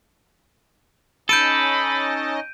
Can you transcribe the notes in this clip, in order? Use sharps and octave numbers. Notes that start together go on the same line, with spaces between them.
C#4 D#4 A4 D#5 B5 G6 D7 D#7